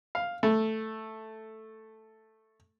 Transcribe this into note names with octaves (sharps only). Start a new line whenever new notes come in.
F5
A3